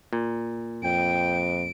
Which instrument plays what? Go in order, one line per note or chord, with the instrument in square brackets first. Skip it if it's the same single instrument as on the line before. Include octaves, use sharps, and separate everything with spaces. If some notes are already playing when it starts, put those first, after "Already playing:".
[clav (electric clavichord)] A#2
[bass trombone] F2 [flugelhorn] G5 [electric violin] D7